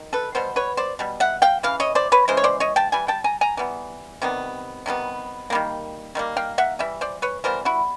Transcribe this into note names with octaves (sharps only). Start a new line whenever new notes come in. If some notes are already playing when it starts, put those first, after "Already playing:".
Already playing: D#3
A4 B4
B2 G3 B3 C5
B4 C#5
C5 D5
B2 G3
E5 F#5
F5 G5
C#3 E3 F5
C#5 D#5
C5 D5
B4 C#5
C#3 E3 G#3 C5
C#5
C5 D5
C#5 D#5
G5 A5
E3 G3 G#5
G5 A5
G#5 A#5
G#5 A#5
E3 G3 B3
C3 D#3 G3 B3
C3 D#3 G3 B3
D#3 G3 A#3
D#3 G3 A#3
F5 G5
E5 F#5
E3 G3 E5
C5 D5
B4 C#5
E3 G3 B3 A#4 C5
E4 F#4